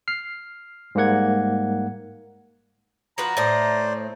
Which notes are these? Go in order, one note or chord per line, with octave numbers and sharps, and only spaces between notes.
F6 C7
G#2 G3 A#3 F#5 G#6
F3 F#4 B4 A#5
A2 A3 C5 D5 D#5